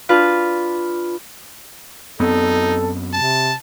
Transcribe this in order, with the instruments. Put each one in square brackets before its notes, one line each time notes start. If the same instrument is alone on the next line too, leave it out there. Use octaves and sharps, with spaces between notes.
[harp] D4 F4 B4
[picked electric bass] F#2 B3 C4 [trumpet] D#4 [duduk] A4
[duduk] C3 [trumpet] A5